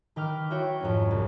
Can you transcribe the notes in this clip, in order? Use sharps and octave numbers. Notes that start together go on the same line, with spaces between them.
D#3 B4 G5 D6 F6
E4 F#4 C#5 G5
F2 G#2 C#4
C2